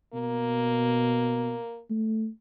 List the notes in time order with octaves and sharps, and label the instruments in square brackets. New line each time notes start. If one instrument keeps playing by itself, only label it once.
[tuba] B2 [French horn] A#3
[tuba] A3